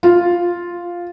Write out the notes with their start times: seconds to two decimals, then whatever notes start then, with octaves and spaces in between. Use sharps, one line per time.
0.03 F4